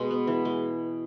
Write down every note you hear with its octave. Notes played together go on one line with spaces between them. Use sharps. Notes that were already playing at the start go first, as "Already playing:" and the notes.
Already playing: B2 G#3 F#5
B3
E3
G#3